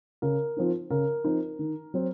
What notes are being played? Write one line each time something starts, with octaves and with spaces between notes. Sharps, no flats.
C#3 A#4
F3 C4 D#4
C#3 A#4
F3 C4 D#4
D#3
F#3 C4